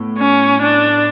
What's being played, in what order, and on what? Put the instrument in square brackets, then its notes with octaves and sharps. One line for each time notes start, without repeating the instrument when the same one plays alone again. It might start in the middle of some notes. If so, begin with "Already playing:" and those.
Already playing: [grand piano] A2 B3
[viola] C#4
D4